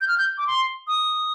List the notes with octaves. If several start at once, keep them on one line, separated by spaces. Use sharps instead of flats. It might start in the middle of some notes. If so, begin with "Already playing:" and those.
G6
F6
G6
D6
C6
D#6